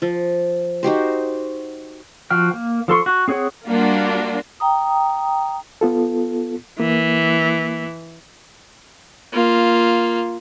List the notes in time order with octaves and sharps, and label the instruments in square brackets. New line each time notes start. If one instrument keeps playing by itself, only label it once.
[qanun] F3
D#4 F#4 G4 C5
[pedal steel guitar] F3 F#4 G5 F6
A#3
F3 A4 C6 C#6
F#4
C4 G#4 C#5 F#5
[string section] G3 A#3 D4 F4 F#4
[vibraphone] G5 A#5 D#6
[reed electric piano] B3 F4 A4
[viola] E3 [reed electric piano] A#3
[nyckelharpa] A#3 F4